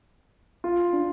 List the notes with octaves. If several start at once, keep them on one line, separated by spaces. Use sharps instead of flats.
F4
D4